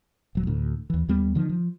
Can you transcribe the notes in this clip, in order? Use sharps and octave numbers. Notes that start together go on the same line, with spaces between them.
D#1 F#3
D2 A2
D#2 E3
D#2 G3 B3
D3 D#3 F3
F3